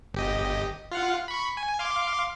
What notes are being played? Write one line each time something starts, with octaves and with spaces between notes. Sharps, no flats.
G1 G4 D#5
F4 F5 F#5
B5 C#6
G#5
F5 C6 D6